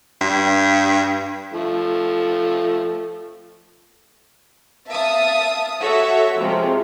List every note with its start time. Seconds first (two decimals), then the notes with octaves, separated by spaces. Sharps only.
0.21 G2
1.54 F3 A3
4.89 E5 F5 A5 D#6
5.81 F#4 A4 C#5 E5
6.39 C3 F3 G#3